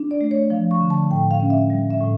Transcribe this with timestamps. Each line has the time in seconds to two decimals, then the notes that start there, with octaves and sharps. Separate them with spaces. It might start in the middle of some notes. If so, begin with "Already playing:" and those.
Already playing: D4
0.11 D5
0.21 A3
0.31 C#5
0.50 F3 F5
0.71 C#6
0.81 D3
0.90 A5
1.10 A2 G5
1.31 F5
1.40 C#4
1.50 E5
1.70 G3
1.90 E5
2.01 A2